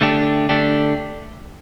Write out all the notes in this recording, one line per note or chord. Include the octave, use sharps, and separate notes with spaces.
D3 A3 D4 G4
D3 A3 D4 G4